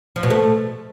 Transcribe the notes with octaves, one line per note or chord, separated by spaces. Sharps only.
F3
B2
A3